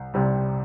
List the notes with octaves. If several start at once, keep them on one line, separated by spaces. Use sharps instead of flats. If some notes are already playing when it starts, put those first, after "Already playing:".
Already playing: C2
C2 C3 G3